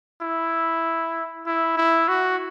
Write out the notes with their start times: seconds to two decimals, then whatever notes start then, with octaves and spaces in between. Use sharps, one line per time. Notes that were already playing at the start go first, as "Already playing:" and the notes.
0.21 E4
1.46 E4
1.77 E4
2.08 F#4